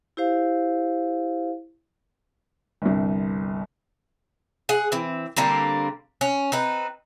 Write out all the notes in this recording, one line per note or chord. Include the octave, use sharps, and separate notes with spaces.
E4 G4 C5 F5
G1 C2
G#4 F#5
E3 C4
D3 G3 A#3 C4
C#4
C4 D#4 B4